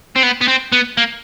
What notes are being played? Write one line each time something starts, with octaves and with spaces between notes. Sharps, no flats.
C4
B3
B3
C4
B3
A#3